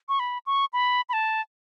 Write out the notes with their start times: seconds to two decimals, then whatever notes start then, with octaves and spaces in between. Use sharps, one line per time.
0.09 C#6
0.20 B5
0.46 C#6
0.73 B5
1.09 B5
1.13 A5